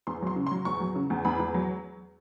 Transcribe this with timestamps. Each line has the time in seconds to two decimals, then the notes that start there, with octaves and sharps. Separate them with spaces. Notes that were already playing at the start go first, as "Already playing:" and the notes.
0.07 E2 C6
0.22 F#3 C6
0.36 C#3
0.47 C6
0.51 F#3
0.65 E2 C#6
0.80 F#3
0.96 C#3
1.10 E2
1.25 E2 B5
1.40 E2
1.54 F#3